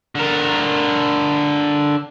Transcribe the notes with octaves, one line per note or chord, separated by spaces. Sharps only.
D3 A#4